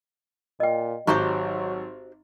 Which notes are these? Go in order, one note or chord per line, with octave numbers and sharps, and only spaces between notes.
A#2 D#5 G5
G#1 F#3 D#4 F#4 G4 C5 A#5